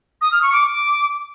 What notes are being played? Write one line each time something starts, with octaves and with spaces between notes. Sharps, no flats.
D#6
F6
C#6
D6